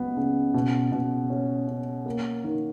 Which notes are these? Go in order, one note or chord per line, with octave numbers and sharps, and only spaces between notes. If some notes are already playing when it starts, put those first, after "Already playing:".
Already playing: C#2 F#3 B3
C#3
B2
B2
C#4
C#4
A#3
D#3